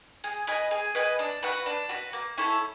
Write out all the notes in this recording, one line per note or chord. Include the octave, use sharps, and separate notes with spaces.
G#4
B4 D#5 G#5
G#4
B4 D#5 G#5
D4
F#4 B4
D4
F#4 B4
A#3
C#4 E4 A4